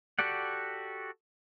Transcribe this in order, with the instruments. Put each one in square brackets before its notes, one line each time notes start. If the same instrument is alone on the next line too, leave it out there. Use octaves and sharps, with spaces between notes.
[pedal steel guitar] F#4 G4 A4 D5 F#5